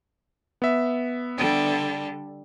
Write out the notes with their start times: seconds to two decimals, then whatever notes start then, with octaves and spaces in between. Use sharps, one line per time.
0.62 B3 E5
1.36 D3 G3 A4